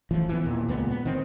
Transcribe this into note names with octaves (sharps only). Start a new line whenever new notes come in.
A1 E3 F3
E3 B3
D#2 A#2
C#2 A#2 B3
B3
D#3 C4